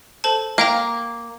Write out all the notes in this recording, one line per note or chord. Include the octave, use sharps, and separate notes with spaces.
A4 C5 A5
A#3 F5 G5 A#5